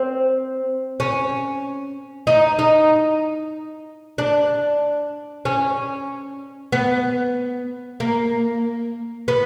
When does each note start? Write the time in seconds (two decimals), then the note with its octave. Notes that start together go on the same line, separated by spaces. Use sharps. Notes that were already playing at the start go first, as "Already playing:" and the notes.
Already playing: C4
1.00 C#4
2.27 D#4
2.59 D#4
4.18 D4
5.45 C#4
6.72 B3
8.00 A#3
9.28 B3